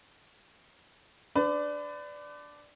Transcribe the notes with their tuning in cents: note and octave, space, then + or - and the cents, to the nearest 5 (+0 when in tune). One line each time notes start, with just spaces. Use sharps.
D4 +0 B4 +40 D5 +0